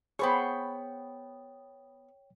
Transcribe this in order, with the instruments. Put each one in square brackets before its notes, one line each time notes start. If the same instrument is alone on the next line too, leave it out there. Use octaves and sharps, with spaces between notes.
[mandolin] B3 B5 C#6 [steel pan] G#4 C5 [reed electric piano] C#5 G5